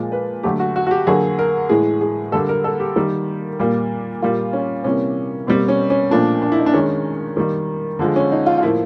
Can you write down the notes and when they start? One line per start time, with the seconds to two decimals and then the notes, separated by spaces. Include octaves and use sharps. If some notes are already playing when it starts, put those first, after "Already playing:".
Already playing: A#2 F3 G#3
0.12 B4
0.43 D3 F#3 A3 G4
0.60 F#4
0.76 F#4
0.87 F#4
0.91 G4
1.07 D3 F#3 A#3 G#4
1.39 A#4
1.69 A2 E3 G#3 G#4
2.01 G#4
2.32 D3 G3 A#3 A4
2.49 A#4
2.64 A4
2.80 G4
2.96 D#3 G3 A#3
3.59 A#2 G3 A#3
4.22 A#2 G3 A#3 F4
4.53 C#4
4.84 C3 E3 G3 A#3 C#4
5.47 B2 G3 A#3 C4
5.68 C#4
5.90 C#4
6.11 A#2 F3 A3 D4
6.42 D4
6.52 E4
6.59 D#4
6.66 D4
6.74 D#3 G#3 C#4
7.37 D#3 G3 A#3
7.99 D3 F3 G#3
8.16 C#4
8.32 D#4
8.46 F4
8.58 F4
8.63 A2 F3 A#3 E4